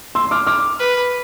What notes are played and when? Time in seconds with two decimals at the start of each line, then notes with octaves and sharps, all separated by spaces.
0.15 C6 E6
0.31 D6 F6
0.47 D6 F6
0.79 B4